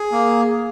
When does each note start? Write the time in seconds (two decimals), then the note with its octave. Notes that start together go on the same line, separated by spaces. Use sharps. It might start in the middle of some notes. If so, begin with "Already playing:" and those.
Already playing: G#4
0.12 A#3